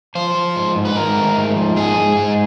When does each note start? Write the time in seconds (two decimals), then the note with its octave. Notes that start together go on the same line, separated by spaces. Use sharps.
0.15 F3 C5
0.35 F3
0.56 G#2
0.75 G#2
0.85 B4
0.95 G#2 A#4
1.15 A3
1.36 G#2
1.56 F3
1.76 G#2 G#4
1.97 G#2
2.17 G#2